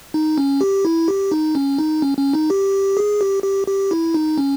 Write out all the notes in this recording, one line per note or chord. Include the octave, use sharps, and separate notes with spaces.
D#4
C#4
G4
E4
G4
D#4
C#4
D#4
C#4
C#4
D#4
G4
G#4
G4
G4
G4
E4
D#4
C#4